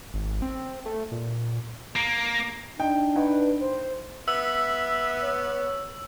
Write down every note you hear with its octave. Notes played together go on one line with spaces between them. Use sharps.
G#1
C4
A3
A#2
A#3
D4 D#4 G5
D#4 B4 F#5
C5
B3 E5 E6
C#5